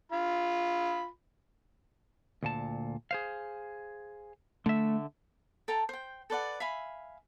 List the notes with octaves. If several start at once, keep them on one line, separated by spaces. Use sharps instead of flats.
F4 B5
D2 A#2 A5
G#4 C5 F5
D3 A3 E5
A4 G5 A5 A#5
C5 G5
A4 B4 D5 F#5
E5 F5 G#5 B5